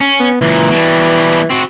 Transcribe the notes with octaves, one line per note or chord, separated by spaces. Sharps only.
C#4
B3
C#2 A#2 E3
B2 G3
C4 F#4